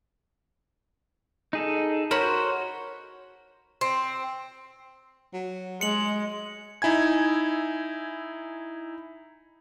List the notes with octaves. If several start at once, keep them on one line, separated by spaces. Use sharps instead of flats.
D#4 G#4 A4
F#4 A#4 C5 C#5 B5
C4
F#3
G#3 C#7 F#7
D#4 E4 G#5 G#6